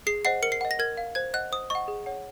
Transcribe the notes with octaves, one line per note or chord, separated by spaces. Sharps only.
G#4 C7
C5 D#5 F#5 C7
A#4 C#7
C7
D#5 F#5
A#6
A#4 G#6
F5
C5 G#6
D#5 F#5 F#6
C5 D#6
D#5 F#5 C#6
G#4
C#5 F#5